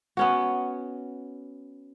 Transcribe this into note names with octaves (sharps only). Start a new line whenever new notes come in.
B3 C#4 F#4